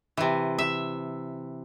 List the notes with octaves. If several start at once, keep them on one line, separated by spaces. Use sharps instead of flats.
C3 E3
E5